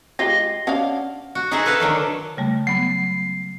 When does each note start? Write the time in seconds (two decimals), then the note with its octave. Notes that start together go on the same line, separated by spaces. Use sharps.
0.19 G#3 F4 G4 A#6 C7 G7
0.67 C#4 D4 F5 F#5
1.35 F#4
1.51 D#4 F#4 G#4 C5 E5 F#5
1.65 A4 B4 E5 F5 A5
1.80 D3 D#3 F#3 A3
2.37 C#3 G3 A3
2.67 F#3 B3 C7